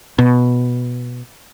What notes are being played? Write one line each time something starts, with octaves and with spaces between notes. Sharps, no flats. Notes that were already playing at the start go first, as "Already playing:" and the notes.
B2